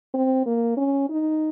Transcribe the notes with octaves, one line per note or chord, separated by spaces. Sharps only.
C4
A#3
C#4
D#4